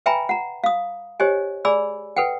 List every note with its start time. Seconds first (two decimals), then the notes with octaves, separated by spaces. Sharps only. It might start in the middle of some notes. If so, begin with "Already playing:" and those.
0.06 B4 E5 G5 G#5 A#5 B5
0.29 F#5 A#5
0.64 F5 D#6
1.20 G4 C5 C#5 D#5 G#5
1.65 G#4 D5 G#5 B5 E6
2.16 A4 B4 F#5 G5